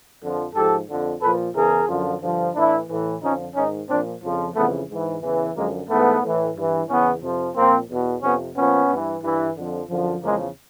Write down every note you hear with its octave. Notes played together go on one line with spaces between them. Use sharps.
F2 D3 F3
G#2 F3 G4 A4
F2 D3 F3
A#2 F3 A4 B4
E2 C#3 E3 G#4 A#4
F#2 D3 F3
G2 D3 F3
A2 E3 D4 E4
A2 E3
F2 D3 F3 C#4 D#4
G#2 D#3 C#4 D#4
A#2 F3 C4 D4
F2 C#3 F3
F2 C#3 E3 A3 B3
G#2 E3
E2 C#3 E3
F#2 D3 F3 G#3 A#3
G#2 E3 A3 B3
A2 E3
G2 E3
E2 C#3 E3 B3 C#4
F2 C3 F3
A#2 F3 A#3 C4
E2 B2
F2 C3 F3 B3 C#4
A#2 F3 B3 C#4
G2 E3
G2 E3
F2 D3 F3
F#2 D3 F3
E2 C#3 F3 G#3 A#3